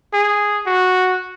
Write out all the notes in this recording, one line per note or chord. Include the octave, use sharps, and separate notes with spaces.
G#4
F#4